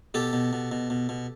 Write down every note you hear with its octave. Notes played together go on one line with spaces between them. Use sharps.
B2 G4 A4
B2
B2
B2
B2
B2